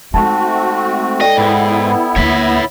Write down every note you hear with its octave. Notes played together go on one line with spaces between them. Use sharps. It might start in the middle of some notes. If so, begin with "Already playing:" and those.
G#3 A3 C4 D#4 F#4 A5
A4 D5 D#5 G5
G#2 B3 E4
D2 A#3 C#5 E5